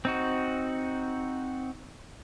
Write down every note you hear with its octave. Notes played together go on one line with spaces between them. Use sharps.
C4 D#4 F#4